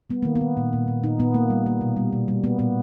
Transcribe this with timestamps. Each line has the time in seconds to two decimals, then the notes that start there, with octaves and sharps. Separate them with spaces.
0.10 G3 B3
0.23 D#3 A#3
0.36 B3
0.41 D#3
0.57 A#2
0.73 A#2
0.88 A#2
1.04 A#2 D#4
1.19 A#2 B3
1.34 A#3
1.50 G3
1.66 A#3
1.81 B2
1.96 G3
2.13 B2
2.28 G3
2.44 A#3 B3
2.59 A#2 B3